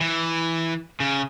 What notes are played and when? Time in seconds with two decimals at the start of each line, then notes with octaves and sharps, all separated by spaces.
0.01 E3
1.00 C#3